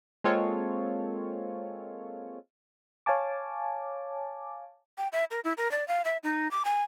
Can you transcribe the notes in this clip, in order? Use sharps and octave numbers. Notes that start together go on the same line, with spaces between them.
G#3 A#3 C4 F4 A4 C#5
C#5 F5 G#5 A5 D6
G5
E5
A#4
E4
A#4
D5
F5
E5
D#4
D6
G#5